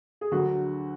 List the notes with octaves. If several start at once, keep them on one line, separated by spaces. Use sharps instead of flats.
G#4
D2 D3 F#3 F#4